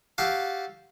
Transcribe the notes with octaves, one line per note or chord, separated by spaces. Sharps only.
F#4 G4 A4 F5